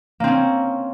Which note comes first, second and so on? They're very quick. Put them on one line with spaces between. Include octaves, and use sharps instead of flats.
A#3 C4 C#4